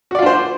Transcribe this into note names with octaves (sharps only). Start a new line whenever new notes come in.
D4 F4 F#4 C5 D5